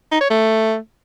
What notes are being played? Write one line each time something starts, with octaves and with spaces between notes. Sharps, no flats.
D#4
C#5
A3